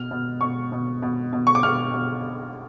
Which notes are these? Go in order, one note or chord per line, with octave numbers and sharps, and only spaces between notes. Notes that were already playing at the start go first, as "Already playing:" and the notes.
Already playing: B2 F6
B2
B2 C#6
B2
B2
B2
C#6
D6
B2 F6
B2